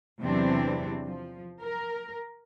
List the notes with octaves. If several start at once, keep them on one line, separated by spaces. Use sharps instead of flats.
E2 C3 E3 F#3 C4 D4
F3
A#4